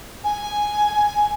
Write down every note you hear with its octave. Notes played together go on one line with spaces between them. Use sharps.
G#5